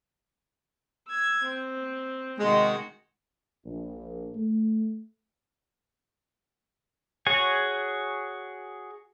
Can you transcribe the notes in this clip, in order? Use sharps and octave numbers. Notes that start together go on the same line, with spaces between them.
E6 G#6
C4
C3 D#3 G#3 F#4
A#1
A3
F#4 G#4 C#5 G#5